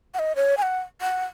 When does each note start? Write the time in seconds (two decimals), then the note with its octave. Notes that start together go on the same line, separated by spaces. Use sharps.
0.14 F#5
0.19 D#5
0.36 C#5
0.57 G#5
0.62 F#5
1.01 F#5